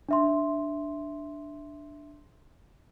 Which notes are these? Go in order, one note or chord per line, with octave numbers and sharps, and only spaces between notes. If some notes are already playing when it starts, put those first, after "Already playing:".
D4 E5 C6